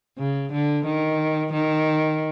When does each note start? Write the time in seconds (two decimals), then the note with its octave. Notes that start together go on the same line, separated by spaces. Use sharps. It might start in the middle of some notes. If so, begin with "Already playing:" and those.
0.18 C#3
0.52 D3
0.85 D#3
1.53 D#3